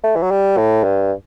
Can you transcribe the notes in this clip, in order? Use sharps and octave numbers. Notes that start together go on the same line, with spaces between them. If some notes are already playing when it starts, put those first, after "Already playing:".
A3
E3
F#3
G3
A2
G2